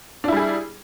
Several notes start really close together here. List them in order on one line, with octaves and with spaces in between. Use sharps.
D4 E4 G3 G#4